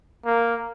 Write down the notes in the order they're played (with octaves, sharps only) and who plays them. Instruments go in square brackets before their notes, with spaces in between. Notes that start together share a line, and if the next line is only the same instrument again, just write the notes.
[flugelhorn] A#3